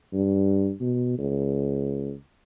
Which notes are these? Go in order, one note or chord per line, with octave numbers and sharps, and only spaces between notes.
G2
B2
C#2